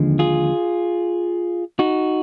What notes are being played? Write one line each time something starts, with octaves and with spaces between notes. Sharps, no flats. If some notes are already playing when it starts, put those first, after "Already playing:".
Already playing: D#2 D3 F3 G#3
F4 G#4
D#4 F#4